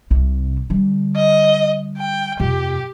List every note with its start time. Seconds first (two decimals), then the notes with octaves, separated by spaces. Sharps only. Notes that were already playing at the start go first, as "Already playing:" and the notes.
0.10 C2 C3
0.70 D3 G3
1.16 D#5
1.98 G5
2.40 F2 C3 G4